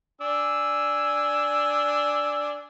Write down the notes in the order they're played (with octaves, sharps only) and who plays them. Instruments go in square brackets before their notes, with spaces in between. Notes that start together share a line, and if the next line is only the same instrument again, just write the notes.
[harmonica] D4 G#5 E6